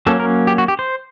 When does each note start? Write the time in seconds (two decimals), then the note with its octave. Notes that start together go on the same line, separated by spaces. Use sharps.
0.06 F#3 A#3 C#4 A4
0.20 A#4
0.47 G4
0.58 F#4
0.68 G4
0.79 C5